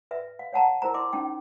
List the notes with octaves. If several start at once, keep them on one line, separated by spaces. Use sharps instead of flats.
B4 E5
F5
C#5 F#5 A5 A#5
E4 A#4 C5 A#5
E4 D#5 C6 D6
C#4 D#4 G5